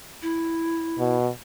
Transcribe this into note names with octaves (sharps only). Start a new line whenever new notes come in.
E4
B2